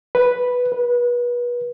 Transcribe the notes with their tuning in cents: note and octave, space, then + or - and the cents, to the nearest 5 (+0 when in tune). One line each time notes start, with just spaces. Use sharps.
B4 +0
B4 -30